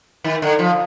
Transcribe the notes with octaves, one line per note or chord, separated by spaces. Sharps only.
D#3
D3
F3